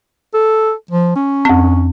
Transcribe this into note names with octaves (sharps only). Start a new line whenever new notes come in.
A4
F3
C#4
F2 C4